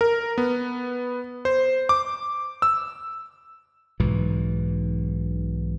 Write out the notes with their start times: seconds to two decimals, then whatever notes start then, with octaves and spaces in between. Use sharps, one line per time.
0.01 A#4
0.38 B3
1.45 C5
1.89 D6
2.62 E6
4.00 B1 G#2 B2 E3